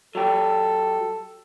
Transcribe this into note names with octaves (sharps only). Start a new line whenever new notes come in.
F#3 G4 A4